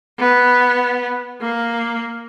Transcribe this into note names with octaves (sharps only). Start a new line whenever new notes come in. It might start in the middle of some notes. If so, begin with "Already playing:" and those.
B3
A#3